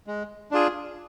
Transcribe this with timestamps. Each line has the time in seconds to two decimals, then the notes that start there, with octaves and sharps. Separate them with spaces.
0.07 G#3
0.51 D4 F4 G#4